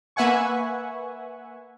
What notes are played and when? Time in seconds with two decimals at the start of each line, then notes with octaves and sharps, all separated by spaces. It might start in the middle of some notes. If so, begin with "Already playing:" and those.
0.16 A#3 B4 E5 F#5 G#5 C#6